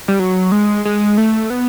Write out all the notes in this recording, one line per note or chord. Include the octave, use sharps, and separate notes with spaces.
G3
F#3
G#3
G#3
A3
B3